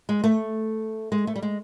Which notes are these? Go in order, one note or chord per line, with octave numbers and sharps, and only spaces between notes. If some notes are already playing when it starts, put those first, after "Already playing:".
G#3
A3
G#3
A3
G3
G#3